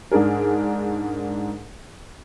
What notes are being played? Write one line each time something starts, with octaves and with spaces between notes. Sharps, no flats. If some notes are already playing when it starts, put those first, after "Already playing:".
G#2 D4 G#4 A#4